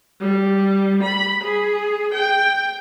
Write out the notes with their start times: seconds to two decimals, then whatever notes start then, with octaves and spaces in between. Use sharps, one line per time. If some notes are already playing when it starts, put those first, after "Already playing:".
0.20 G3
1.03 B5
1.44 G#4
2.14 G5